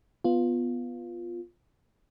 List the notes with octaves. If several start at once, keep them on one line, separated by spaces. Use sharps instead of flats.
B3 F4